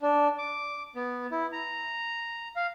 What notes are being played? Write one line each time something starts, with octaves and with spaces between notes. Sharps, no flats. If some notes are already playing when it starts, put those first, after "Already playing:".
D4
D6
B3
E4
A#5
F5